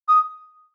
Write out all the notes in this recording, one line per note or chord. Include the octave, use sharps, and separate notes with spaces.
D#6